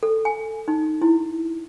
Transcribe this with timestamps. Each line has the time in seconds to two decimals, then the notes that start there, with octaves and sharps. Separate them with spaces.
0.03 A4
0.25 G#5
0.68 D#4
1.02 E4